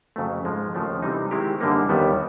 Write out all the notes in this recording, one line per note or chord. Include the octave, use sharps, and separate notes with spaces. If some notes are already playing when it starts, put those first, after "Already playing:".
F2 C#3 F#3 A3
G#2 F3 G#3
D#2 C#3 F3 A3
C3 E3 G3 C4 D#4
D#3 G#3 C4 E4 G4
F#2 D3 G3 A#3 D#4
D#2 D#3 G3 B3